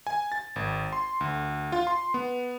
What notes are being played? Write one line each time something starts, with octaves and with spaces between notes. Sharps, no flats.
G#5
A6
G#1
C6
D2
F4
C6
B3